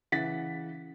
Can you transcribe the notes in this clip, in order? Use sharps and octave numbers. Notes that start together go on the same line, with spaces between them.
C#3 E3 F#5 A6 B6